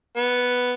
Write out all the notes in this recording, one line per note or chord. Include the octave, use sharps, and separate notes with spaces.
B3